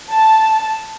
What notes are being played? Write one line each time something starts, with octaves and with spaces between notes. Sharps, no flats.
A5